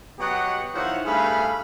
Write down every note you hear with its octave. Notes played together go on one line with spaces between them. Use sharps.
F#3 B3 G4 C#5 D#5 F#5
D#3 F3 E4 C5 C#5 F#5
G2 A3 G#4 F5 B5